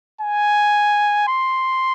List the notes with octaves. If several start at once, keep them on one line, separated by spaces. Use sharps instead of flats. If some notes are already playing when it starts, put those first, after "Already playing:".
G#5
C6